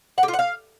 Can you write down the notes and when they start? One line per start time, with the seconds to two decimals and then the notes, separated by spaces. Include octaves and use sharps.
0.18 F#5
0.23 G4
0.28 F4
0.34 F#5
0.39 F5